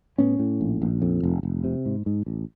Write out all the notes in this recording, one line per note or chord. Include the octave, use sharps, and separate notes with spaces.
A2 B3 C#4
A2
A#1
A#1
F2
F1
F1
C3
G#2
G#2
A1